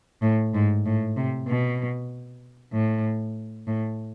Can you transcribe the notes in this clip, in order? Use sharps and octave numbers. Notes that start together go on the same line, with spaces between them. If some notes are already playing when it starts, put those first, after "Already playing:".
A2
G#2
A2
C3
B2
A2
A2